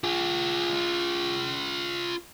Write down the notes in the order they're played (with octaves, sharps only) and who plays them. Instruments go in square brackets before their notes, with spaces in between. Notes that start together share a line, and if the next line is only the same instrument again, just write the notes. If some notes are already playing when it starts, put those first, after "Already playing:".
[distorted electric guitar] F4 G#4